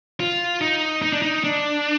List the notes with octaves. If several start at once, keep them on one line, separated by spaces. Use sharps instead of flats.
F4
D#4
D#4
D4
D#4
D4